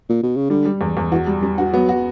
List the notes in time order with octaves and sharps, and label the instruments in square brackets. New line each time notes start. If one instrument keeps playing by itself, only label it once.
[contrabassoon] A#2
B2
C#3
[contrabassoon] D3 [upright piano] G3
[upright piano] G3
E2
E2
[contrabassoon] E3 [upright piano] F#4
[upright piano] G3
[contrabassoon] F#2 [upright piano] G3
[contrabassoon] G2 [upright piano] F#4
[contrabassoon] F#3 [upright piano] B3
[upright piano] F#4